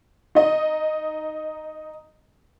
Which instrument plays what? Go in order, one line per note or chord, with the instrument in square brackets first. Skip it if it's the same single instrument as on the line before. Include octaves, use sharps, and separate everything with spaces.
[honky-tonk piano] D#4 D#5